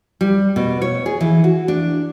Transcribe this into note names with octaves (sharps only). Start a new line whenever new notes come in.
G3
B2
C#5
G#4
E3
F#4
D4